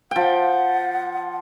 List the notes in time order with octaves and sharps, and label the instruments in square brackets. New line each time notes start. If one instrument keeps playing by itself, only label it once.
[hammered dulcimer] F3 G5 [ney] F#5